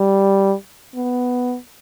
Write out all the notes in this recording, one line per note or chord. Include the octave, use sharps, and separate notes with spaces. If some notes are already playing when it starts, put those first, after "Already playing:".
Already playing: G3
B3